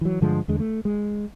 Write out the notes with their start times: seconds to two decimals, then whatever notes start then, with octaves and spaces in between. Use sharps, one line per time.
0.01 E3 F#3
0.21 G2 D3 F3 G#3
0.48 E2 D3 G#3
0.60 A3
0.85 G#3